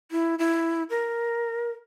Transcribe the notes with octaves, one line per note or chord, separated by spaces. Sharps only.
E4
E4
A#4